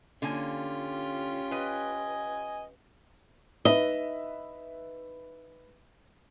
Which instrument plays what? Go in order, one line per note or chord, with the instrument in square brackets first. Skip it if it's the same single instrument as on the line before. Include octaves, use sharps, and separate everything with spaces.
[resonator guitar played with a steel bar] D3 A#3 G#5 [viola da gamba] C#4 F4 G4
[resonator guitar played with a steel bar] B4 [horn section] D#5 G#5
[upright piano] D#4 B4 E5 [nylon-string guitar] D#5